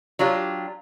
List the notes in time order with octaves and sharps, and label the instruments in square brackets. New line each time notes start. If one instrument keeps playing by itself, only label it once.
[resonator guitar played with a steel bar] F#3 D4 F4 G4